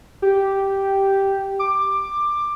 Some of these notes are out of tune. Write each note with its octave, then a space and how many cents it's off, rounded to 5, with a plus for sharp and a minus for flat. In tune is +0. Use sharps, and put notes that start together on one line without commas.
G4 -5
D6 +15